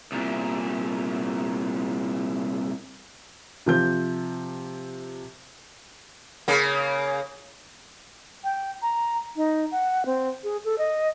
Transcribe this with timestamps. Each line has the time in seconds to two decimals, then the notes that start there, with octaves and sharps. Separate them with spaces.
0.12 C2 A#2
3.66 C3 F3 G6
6.48 C#3 A#3
8.44 G5
8.82 A#5
9.36 D#4
9.72 F#5
10.06 C4
10.44 G#4
10.65 A4
10.78 D#5